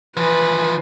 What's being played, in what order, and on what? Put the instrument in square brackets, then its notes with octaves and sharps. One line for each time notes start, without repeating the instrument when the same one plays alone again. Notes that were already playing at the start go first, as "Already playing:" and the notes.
[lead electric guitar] E3 F3 [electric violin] B4